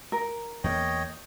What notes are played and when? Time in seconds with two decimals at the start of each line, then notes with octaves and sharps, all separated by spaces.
0.12 A#4
0.64 E2 A3 A#3 C#5 D#5 G5